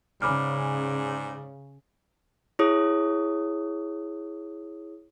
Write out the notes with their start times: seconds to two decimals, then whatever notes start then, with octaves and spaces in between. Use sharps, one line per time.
0.22 G#2 C#3 D5 B5 D6 F6
2.59 E4 G#4 C#5 D#6